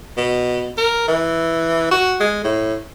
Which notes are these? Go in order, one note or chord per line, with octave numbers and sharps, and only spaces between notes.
B2
A#4
E3
F#4
G#3
A2